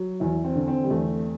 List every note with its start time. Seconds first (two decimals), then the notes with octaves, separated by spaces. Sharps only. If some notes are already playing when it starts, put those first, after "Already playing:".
Already playing: F#3
0.20 E2 E4
0.44 C4
0.55 D3
0.68 C4
0.83 G3
0.90 E2 A3